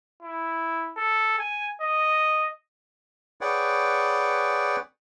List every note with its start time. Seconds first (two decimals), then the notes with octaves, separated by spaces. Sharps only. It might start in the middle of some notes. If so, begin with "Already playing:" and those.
0.23 E4
0.97 A4
1.38 G#5
1.82 D#5
3.41 G#4 B4 C#5 D5 F#5 G5